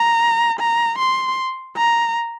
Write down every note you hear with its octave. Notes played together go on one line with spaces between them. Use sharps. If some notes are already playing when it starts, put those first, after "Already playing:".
Already playing: A#5
A#5
C6
A#5